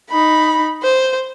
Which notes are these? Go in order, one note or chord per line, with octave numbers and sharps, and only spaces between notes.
D#4 B5
C5